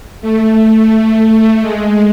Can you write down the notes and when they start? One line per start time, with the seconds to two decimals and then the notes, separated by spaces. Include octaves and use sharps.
0.22 A3
1.61 G#3